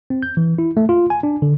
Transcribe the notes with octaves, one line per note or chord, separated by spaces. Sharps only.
C4
G6
E3
E4
A3
F4
G#5
D4
D3